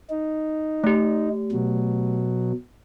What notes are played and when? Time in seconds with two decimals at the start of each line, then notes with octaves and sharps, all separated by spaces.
0.10 D#4
0.84 A3 G4
1.52 B2 F#3